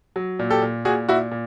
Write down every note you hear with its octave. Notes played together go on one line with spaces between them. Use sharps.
F#3
A#2
G4 A4
A#2
A#2 F#4 G#4
A#2 E4 F#4
A#2